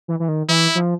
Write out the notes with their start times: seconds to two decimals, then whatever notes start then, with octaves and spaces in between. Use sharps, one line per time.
0.08 E3
0.20 E3
0.28 D#3
0.48 E3 E4
0.75 F3